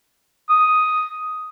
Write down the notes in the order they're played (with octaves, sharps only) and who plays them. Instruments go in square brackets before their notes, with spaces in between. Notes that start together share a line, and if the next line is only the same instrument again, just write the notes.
[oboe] D#6